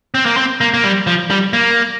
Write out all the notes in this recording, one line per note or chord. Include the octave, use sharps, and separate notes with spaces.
C4
A#3
C4
A#3
A#3
G3
F3
G3
A#3